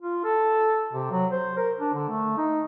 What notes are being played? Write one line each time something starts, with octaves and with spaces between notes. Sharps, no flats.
F4
A4
C3
F#3
C5
A#4
D4
D3
A3
D#4